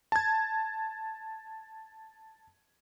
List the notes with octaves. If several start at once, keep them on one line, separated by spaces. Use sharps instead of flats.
A5 G#6